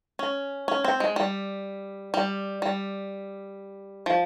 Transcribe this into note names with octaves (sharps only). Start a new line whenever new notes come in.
C#4
C#4
C4
G#3
G3
G3
G3
F3